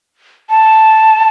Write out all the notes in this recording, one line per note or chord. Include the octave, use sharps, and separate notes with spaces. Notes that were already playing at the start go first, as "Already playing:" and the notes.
A5